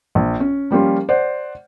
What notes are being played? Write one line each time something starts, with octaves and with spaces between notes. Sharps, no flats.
A#1
C#4
F3 G3 A#3 C#4 F4
C5 D5 F#5